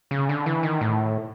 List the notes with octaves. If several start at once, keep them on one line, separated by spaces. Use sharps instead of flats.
C#3
D3
E3
D#3
A2